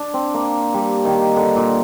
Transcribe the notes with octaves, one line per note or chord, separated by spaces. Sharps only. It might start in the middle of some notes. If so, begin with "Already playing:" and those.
Already playing: D4
C4
A#3
G3
D#3
D3
A#2